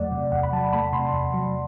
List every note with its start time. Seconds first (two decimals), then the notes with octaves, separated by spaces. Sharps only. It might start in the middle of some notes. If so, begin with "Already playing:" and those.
Already playing: E2 F#3 A3 D5 F#5
0.12 C3
0.32 E2 F#5
0.43 B5
0.53 F#3 A5
0.73 A3 B5
0.93 C3 C6
1.13 E2
1.34 F#3